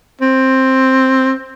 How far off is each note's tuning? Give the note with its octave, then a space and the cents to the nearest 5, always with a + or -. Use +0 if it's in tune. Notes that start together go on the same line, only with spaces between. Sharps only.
C4 +10